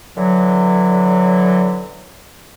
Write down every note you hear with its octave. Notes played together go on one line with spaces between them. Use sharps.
D3 E3 F#3